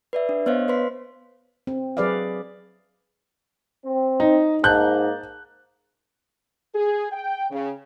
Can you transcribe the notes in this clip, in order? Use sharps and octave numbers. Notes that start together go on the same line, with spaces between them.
B4 D5 E5
D4
B3 C5 C#5 D#5 F5
B4 C5 C6 B6
C4
F#3 G#4 B4 D5 E5 F5
C4
D#4
G#2 A#3 D#4 A5 F#6 G6
G#4
G5
C#3